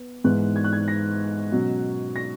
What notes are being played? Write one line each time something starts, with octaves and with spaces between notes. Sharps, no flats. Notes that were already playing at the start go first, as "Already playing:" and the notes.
Already playing: B3
G#2 E3 G#3 B3 F#6
G#6
F#6
G#6
A#6
B2 F#3 C#4
A#6